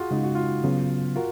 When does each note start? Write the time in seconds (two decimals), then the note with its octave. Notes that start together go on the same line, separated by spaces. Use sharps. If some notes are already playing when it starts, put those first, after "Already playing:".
Already playing: F4 F#4 G#4
0.11 C#3 G#3 D#4 F4
0.23 F#4
0.35 F4
0.64 C#3 F#3 B3
1.16 F4 F#4 A#4